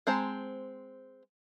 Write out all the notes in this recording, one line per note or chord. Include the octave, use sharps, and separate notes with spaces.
G#3 C4 C5 A5 A#5